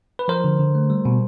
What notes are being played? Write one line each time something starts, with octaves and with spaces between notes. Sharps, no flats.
B4
F3 A#4 C5
D3
D3
A3
G3
B2